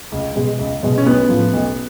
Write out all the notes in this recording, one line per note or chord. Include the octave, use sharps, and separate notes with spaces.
C#2
B2 G#3
C#2
B2 G#3
C#4
B1 B3
A2 F3
B1